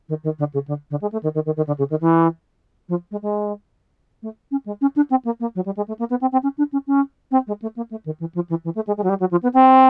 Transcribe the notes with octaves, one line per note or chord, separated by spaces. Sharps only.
D#3
D#3
D3
C#3
D3
D3
G#3
A3
D#3
D#3
D#3
D#3
D3
C#3
D#3
E3
F3
G#3
G#3
A3
C#4
G#3
C#4
D4
C4
A#3
A#3
F#3
G3
G#3
A3
A#3
B3
C4
C4
C#4
D4
C#4
C#4
C4
G#3
A3
A#3
A3
D#3
E3
F3
E3
E3
A3
G#3
G#3
F#3
G3
F#3
F3
B3
C4